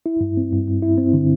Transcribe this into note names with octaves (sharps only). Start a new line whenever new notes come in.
E4
G2
C4
G2
G2
E4
C4
D3